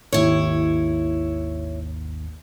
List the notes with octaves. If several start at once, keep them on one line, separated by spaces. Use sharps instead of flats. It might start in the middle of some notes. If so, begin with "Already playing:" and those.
G#1 D#2 E4 C#5